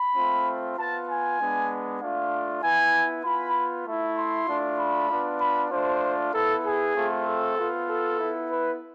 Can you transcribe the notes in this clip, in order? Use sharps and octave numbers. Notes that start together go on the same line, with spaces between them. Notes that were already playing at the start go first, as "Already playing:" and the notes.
Already playing: B5
A3 C4 F4
B3 F4 A5
G#5
G#3 B3 D4
A3 D4 F4 F5
B3 E4 G#5
B3 F4 B5
A3 E4
C6
A3 D4 F4
B5
B3 D4 F4
B5
A3 D4 F4 C5
B3 E4 A4
G#4
A3 C4 F4
A4
B3 F4
A4
B3 E4
B4